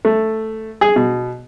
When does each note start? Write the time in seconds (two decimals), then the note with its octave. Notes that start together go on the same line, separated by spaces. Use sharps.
0.05 A3
0.81 G#4
0.96 B2